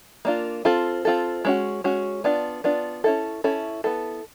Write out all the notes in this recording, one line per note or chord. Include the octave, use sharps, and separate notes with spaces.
A#3 D4 F4
C4 F4 A4
C4 F4 A4
G#3 C#4 F#4
G#3 C#4 F#4
B3 D4 F4
B3 D4 F4
C#4 E4 A4
C#4 E4 A4
B3 E4 A4